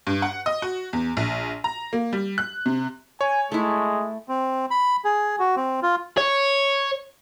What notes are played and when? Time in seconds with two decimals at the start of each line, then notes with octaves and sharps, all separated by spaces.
0.07 G2
0.22 F#5
0.46 D#5
0.62 F#4
0.93 E2
1.17 A#1
1.64 A#5
1.93 A#3
2.13 G3
2.38 F#6
2.66 C3
3.21 C#5 G#5
3.52 G#3 A3 E4
4.29 C4
4.71 B5
5.05 G#4
5.39 F#4
5.56 C4
5.83 F4
6.18 C#5